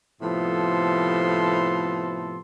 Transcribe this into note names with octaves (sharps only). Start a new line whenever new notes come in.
A2 C3 F3 B3 A4 C6